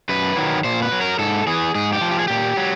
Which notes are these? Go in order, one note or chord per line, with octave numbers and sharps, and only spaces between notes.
F#2 B4
D#3 F#3
A#2 C5
B4
F#3
A#4
G#2 A4
E3 G#4
G#2 G#4
G4
F3
G4
G#4
A#2 G4
F#3